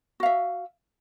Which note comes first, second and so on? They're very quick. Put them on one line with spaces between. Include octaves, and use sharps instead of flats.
F#4 F5 E5